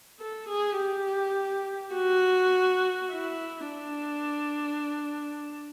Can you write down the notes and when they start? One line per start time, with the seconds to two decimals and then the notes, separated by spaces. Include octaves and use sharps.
0.20 A4
0.49 G#4
0.78 G4
1.95 F#4
3.11 E4
3.70 D4